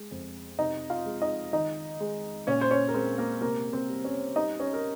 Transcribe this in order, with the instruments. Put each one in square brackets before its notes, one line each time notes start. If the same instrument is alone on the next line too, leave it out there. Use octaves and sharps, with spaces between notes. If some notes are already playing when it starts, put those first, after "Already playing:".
Already playing: [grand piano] G#3
F2
C3 D#4 D#5
F4 F5
G#3
D#4 D#5
D#3 D#4 D#5
G#3
A#2 C#4 C#5
C5
C#4 C#5
A#4
G#3 C4 C5
A#3 A#4
C3 A#3 A#4
C4 C5
G3
C#4 C#5
G3 D#4 D#5
C#4 C#5
A#4